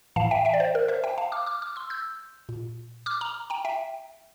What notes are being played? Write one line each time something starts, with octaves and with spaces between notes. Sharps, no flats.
A2 E3 F5 A5
E5 G5
E5 G5
D5
C5
A#4
C5 E5
E5 G5
F5 A5
D6 F6
D6 F6
D6 F6
C6 E6
E6 G6
A#2
D6 F6
A#5 D6
G5 A#5
E5 G5